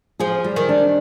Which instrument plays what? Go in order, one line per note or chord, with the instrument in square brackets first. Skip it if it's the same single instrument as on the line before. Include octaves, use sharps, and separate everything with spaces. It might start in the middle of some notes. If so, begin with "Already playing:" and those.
[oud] F3 [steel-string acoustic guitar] G#4
[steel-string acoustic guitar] G3
[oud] D#3
[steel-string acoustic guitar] D4